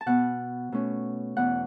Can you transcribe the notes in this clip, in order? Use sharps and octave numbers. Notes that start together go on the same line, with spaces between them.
A5
B2 B3 F#5
B2 A3 C#4
E2 B2 B3 F#5